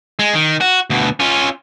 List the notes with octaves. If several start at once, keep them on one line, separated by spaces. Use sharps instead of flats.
G#3
D#3
F#4
D2 B2
C#4 F4